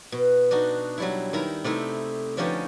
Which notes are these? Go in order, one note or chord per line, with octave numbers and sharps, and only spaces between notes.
B2
D4 D#4 F#4
F#3 G3 E4
D#3 E4 A#5
C3 A3 D#4 E4
D3 F3 C#4 D#4 G4 A4